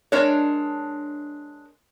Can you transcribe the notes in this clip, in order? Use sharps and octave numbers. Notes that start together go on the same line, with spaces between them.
G#3 D4 A#4 C#5